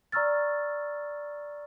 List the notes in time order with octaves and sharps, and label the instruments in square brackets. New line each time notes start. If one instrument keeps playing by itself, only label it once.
[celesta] D5 A#5 C#6 E6 F6 A6